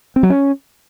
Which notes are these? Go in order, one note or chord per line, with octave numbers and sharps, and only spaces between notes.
C4
F#3
C#4